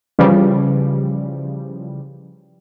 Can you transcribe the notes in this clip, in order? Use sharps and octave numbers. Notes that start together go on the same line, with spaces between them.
C#3 E3 F3 G3